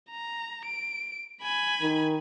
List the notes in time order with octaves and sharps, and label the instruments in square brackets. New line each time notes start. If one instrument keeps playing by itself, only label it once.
[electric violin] A#5
D7
G#5 B5
[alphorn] D#3